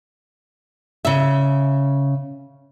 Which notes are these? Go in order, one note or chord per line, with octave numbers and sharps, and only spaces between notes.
C#3 E5